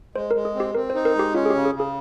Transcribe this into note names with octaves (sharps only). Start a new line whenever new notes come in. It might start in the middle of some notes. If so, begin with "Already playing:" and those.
G#3 C5
A#4
G#3
G#4
C4 G4
C4 A#4
C5
D#4
A#4
G#3 G4
C#4 F4
G#4
G4
C#3
G#4
C#3
G#4